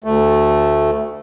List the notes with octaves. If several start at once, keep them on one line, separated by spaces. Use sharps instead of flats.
D2 A3